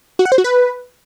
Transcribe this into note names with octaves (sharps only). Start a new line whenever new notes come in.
F#4
F#5
C5
F#4
B4